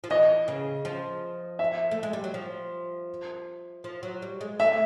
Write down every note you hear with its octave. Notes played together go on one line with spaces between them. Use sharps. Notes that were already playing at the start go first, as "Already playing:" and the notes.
F3
E3 D#5
C#3
F3
E5
A3
G#3
G3
F#3
F3
F3
F#3
G3
G#3
A3 E5